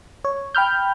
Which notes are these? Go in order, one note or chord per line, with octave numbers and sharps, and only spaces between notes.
C#5
G5 B5 F6 G6